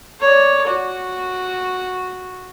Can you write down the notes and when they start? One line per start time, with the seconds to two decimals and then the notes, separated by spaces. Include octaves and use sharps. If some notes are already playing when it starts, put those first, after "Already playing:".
0.20 C#5 D5
0.67 F#4